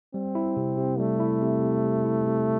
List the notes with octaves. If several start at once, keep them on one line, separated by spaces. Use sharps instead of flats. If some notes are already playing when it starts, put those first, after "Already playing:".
G3 C4
E4
C3
C3
G3 A3
E4
C3
C3
G3
E4
C3